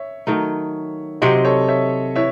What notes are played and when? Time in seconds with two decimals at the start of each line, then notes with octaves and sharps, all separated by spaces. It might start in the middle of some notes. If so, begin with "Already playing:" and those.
Already playing: C#5 E5
0.27 D#3 F#3 A3 D#4
1.22 C3 F#3 C4 C5 D#5
1.45 A4 C#5
1.68 C#5 E5
2.16 E3 C#5 E5